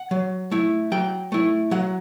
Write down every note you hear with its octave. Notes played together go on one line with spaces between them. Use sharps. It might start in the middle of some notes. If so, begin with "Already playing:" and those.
Already playing: F#5
F#3
A3 E4
F#3 G5
A3 E4
F#3 F#5